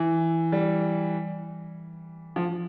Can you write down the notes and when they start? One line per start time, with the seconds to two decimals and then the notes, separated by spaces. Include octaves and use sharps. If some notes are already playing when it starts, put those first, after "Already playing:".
Already playing: E3
0.52 G3
2.36 F3